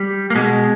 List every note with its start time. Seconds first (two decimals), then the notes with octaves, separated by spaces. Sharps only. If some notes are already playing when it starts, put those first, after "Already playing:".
Already playing: G3
0.30 A#3
0.35 B2 G#3